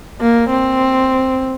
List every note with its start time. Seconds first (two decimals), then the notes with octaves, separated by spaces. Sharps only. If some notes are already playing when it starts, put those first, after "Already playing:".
0.21 A#3
0.50 C4